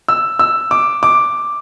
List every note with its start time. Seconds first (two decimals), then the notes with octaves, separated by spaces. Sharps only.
0.08 E6
0.39 E6
0.71 D6
1.03 D6